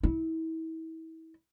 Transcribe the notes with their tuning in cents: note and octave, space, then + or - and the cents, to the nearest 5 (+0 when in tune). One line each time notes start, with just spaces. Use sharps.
E4 -35